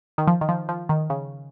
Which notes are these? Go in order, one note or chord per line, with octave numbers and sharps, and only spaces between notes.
D#3
F3
D#3
F3
F3
D#3
C#3